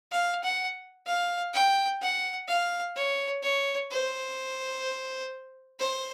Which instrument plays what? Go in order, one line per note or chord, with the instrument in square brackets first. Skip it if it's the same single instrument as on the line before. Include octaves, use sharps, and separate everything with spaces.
[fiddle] F5
F#5
F5
G5
F#5
F5
C#5
C#5
C5
C5